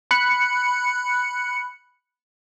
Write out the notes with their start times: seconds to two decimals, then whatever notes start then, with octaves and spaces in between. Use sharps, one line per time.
0.11 B5 F#6 C#7